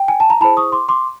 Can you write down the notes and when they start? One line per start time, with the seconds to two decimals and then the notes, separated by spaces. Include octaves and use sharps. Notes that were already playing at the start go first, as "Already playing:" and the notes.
Already playing: G5
0.08 G#5
0.20 A5
0.30 A#5
0.40 E4 G#4 C5 A5 B5
0.57 C#6 D#6
0.72 C6 D6
0.89 C6 D6